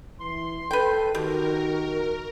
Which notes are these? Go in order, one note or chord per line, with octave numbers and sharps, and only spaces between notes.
E3 C6
A4 B4 G5
D#3 F#4 G4 A#4